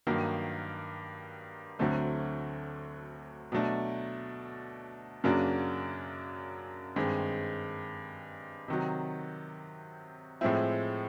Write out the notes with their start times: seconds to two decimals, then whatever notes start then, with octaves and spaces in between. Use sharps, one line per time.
0.07 G2 D#3 F#3 A#3
1.79 D2 D3 F#3 A3 C4
3.52 B2 F#3 A3 D4
5.24 F#2 C#3 F#3 A#3 D4
6.96 G2 D#3 G#3 C4
8.68 C3 D#3 F#3
10.41 A2 F3 G#3 C4 E4